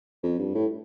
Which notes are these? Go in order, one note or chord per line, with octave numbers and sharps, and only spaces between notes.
F2
G2
A2